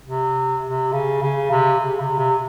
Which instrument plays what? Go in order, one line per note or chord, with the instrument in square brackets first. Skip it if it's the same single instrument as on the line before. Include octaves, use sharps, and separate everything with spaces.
[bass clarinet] C3
C3
C#3
C#3
C3
C#3
C3
C3